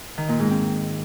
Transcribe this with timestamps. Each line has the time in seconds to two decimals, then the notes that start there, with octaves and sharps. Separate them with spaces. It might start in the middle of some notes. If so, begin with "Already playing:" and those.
0.18 D#3
0.29 A#2
0.39 G#2
0.50 C4